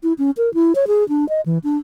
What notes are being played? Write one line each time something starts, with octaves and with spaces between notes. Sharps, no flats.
E4
C#4
A#4
E4
C#5
G#4
D4
D#5
E3
D4